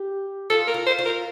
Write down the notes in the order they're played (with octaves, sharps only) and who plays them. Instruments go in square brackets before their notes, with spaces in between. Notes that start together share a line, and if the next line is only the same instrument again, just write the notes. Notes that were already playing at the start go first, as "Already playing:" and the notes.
Already playing: [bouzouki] G4
[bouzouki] F4 [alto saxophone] A4
[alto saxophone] A#4
[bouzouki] F4
[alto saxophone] C5
[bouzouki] F4
[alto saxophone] A#4